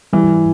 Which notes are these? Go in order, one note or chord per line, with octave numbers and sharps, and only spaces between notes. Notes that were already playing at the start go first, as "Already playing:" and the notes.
E3 G3